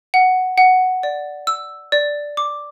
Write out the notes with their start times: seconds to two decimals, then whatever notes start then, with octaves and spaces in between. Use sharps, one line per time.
0.14 F#5
0.58 F#5
1.03 D5
1.47 E6
1.92 D5
2.37 D6